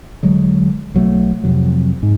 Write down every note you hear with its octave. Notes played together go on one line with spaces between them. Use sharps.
E1 D3 F#3 G#3
B1 F#3 G3 A3
F2 C3 F#3
G#2